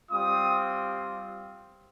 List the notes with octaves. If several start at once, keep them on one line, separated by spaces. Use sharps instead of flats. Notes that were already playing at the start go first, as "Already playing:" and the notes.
G3 C4 F4 D#6